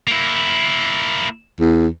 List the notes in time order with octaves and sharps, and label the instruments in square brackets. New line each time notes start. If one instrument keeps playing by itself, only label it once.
[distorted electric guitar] A#3 E4
[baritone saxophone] E2